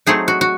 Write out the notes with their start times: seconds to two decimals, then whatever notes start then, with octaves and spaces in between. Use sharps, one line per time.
0.07 F#3 A3 C4 D#4 G#4
0.28 F#4
0.41 F#4